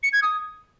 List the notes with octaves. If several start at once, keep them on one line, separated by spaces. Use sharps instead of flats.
C#7
G#6
D#6